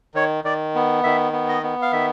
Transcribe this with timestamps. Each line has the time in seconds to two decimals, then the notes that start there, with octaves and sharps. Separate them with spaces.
0.15 D#3 C#5
0.44 D#3 D5
0.75 B3
1.03 D#3 E5
1.33 B3
1.49 D#5
1.63 B3
1.82 F5
1.92 D#3 E5